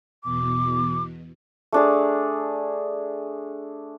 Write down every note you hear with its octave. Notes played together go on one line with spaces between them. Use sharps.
E2 B2 D6
A3 D4 G#4